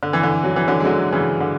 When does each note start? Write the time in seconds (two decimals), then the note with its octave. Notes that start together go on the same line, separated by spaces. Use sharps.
0.03 D3
0.13 E3
0.23 D3
0.44 F#3
0.56 E3
0.67 D3 F#3
0.80 G#3
0.85 D3 F#3
1.13 C#3 E3
1.40 D3